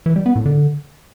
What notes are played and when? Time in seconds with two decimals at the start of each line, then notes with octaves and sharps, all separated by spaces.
0.06 E3
0.16 G3
0.26 B3
0.36 A2
0.46 D3